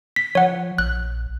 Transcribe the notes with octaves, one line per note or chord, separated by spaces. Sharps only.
B6
F3 C#5 F#5
A#1 F#6